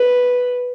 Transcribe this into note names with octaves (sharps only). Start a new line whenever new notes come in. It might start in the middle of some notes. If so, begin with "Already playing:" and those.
Already playing: B4